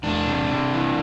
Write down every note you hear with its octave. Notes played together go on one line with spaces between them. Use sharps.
E2 D4
C3
C3
E3